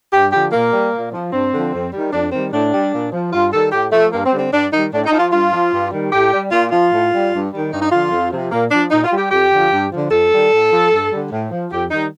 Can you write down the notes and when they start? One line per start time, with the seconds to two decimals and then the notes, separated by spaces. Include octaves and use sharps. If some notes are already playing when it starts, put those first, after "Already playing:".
0.13 G2 G4
0.32 D3 F3 G4
0.52 A#2 A#3
0.72 G3
0.93 A#2
1.12 F3
1.32 G2 C4
1.52 D3 F3
1.72 F2
1.92 D#3 G3
2.12 F2 D4
2.32 D#3 G3 C4
2.52 A2 D4
2.72 G3
2.93 A#2
3.12 F3
3.32 G2 F4
3.51 D#3 G3 A4
3.72 A2 G4
3.92 F3 A3
4.12 G2 A#3
4.25 C4
4.32 D3 G3
4.38 C4
4.51 G2 D4
4.71 D#3 G3 D#4
4.92 A2 D4
5.06 D#4
5.11 F3
5.19 F4
5.32 G2 F4
5.52 F3
5.72 G2
5.91 D#3 G3
6.12 A2 G4
6.31 G3
6.51 A#2 F4
6.71 F3 F4
6.91 A2
7.12 G3
7.32 G2
7.52 D#3 G3
7.71 G2 D#4
7.82 D#4
7.91 D3 F3 F4
8.11 F2
8.31 C3 F3
8.51 A#2 A#3
8.71 F3 D4
8.91 A#2 D#4
9.04 F4
9.11 G3
9.18 G4
9.30 F2 G4
9.51 D3 F3
9.70 G2
9.91 D3 F3
10.10 F2 A4
10.31 D#3 G3
10.51 A2
10.70 F3
10.91 G2
11.10 D3 G3
11.31 A2
11.51 F3
11.70 F2 G4
11.91 D#3 G3 D#4